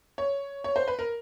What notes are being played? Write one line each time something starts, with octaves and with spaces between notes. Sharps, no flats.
C#5
C#5
C5
B4
A#4